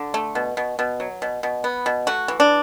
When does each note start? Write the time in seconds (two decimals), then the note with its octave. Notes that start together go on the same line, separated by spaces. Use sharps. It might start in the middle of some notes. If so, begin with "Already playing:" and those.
Already playing: D3
0.14 A3
0.35 B2
0.57 B2
0.79 B2
1.00 F#3
1.22 B2
1.43 B2
1.64 B3
1.86 B2
2.07 A3 F#4
2.28 E3
2.40 D4